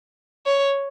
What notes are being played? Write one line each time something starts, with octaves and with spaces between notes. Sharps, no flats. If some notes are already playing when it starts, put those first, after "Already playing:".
C#5